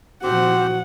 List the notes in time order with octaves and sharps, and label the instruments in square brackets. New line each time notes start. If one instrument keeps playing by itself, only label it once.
[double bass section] A#2 F3 [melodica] C4 G4 C5 [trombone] F#4 [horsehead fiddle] F#5